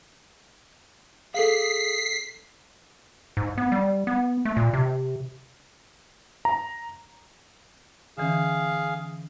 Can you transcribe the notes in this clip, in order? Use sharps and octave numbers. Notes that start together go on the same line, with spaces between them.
G#4 A4 F5 B6 C7
G#2
B3
G3
B3
A3
A#2
C3
A#5
D3 E3 C#4 G#4 F5